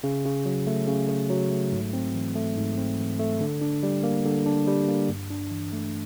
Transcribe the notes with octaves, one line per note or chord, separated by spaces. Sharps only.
C#3
C#3
F#3
A3
C#3
C#3
F#3
A3
G#2
C4
E3
A3
G#2
C4
E3
A3
D3
D4
G3
A#3
D3
D4
G3
A#3
G2
D4
E3
A3